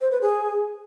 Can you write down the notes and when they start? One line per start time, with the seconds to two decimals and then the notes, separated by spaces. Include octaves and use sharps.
0.01 C5
0.11 B4
0.21 G#4